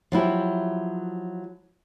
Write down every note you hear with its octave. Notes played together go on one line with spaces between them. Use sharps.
F3 F#3 E4 G4